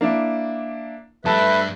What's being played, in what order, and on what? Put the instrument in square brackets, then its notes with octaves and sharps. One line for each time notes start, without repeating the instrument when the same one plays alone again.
[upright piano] A#3 D4 E4
[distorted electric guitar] G2 [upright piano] A3 A5 [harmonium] B4 E5